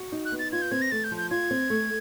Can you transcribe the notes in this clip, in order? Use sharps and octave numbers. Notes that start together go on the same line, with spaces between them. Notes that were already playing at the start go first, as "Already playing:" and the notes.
Already playing: F#4
D#4
F#6
B3
A6
F4 G#6
G6
C4 G#6
A#6
A3 A6
G6
F3
G6
F4 G#6
C4
A3